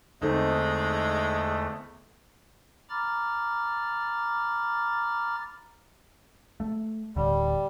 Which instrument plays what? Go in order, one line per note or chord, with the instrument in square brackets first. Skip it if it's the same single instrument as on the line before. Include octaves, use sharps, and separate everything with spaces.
[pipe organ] E2 A3 [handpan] D3 A4 [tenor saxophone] G#3 [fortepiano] C4 D#4
[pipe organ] A#5 B5 D6 F6 A6
[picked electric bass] A3
[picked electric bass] D1 A2 D3 [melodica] G3